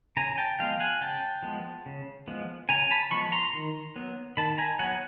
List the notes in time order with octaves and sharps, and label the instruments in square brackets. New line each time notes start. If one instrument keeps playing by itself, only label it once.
[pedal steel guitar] C#3 G#5 A#5
G5 A5
F3 G#3 B3 F5 G5
F#5 G#5
C#3 G5 A5
F3 G#3 B3
C#3
F3 G#3 B3
C#3 G#5 A#5
A5 B5
F3 G#3 B3 B5 C#6
A#5 C6
D#3
F#3 B3
D#3 A5 B5
G#5 A#5
F#3 B3 F#5 G#5